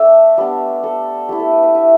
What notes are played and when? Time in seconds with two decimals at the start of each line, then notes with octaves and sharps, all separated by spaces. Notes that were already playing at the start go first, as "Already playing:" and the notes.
Already playing: A3 D4 D5 E5 A5
0.38 G3 B3 D4
0.84 A4
1.29 A3 E4 G4
1.40 A4
1.52 B4
1.63 B4
1.75 E5